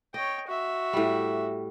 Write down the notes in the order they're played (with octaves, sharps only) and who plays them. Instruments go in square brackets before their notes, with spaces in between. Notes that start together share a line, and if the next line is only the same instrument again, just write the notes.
[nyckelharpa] C#5 G5 [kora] D#5
[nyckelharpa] F#4 E5
[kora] A2 G3